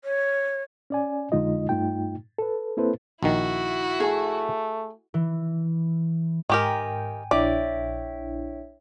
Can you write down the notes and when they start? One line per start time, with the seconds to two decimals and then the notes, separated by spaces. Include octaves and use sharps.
0.05 C#5
0.90 C#4 D5 G#5
1.32 F2 D3 G#3 D#4 F4 D#5
1.69 G2 A3 D#4 F4 G5
2.38 A4 B4
2.77 A#3 C4 E4 A4 B4 C5
3.23 A#1 D#3 E4 F#4
4.00 A3 G#4
5.14 E3
6.50 G#2 D#3 G4 A#4 G5 G#5
7.31 A#1 D4 E4 C#5 D5 E5 G5